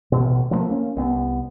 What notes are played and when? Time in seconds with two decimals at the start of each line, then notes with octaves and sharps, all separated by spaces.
0.12 A1 B2
0.51 F3 F#3 A3 A#3
0.69 A#3 C#4
0.96 C2 B3